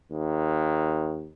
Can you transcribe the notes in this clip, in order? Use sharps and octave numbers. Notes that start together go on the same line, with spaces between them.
D#2